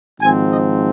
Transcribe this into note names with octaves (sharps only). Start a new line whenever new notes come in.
G#1 G#2 F3 C4 G#5
D#5